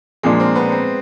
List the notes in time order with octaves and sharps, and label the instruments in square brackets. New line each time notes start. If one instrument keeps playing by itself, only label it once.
[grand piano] A#2 F3 A#3 D4 [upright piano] G#3
[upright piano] C4
B3
C4